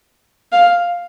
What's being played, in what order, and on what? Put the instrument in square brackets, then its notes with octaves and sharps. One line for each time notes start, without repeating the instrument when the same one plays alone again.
[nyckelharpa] F5